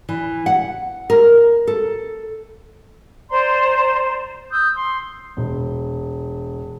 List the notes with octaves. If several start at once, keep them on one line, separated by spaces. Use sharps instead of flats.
E3
F#5
A#4
A4
C5 D5 A#5 C6
D#6 E6 G6
C6
E1